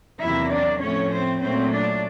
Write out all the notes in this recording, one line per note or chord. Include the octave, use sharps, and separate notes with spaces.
E2 C3 D#3 F#3 A#3 E4 E5
D4 D5
A2 F3 A3 C4 C#4 C#5
C4 C5
A#2 F#3 A3 C4 C#4 C5
D4 D5